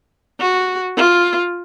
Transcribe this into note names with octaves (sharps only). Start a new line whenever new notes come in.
F#4
F4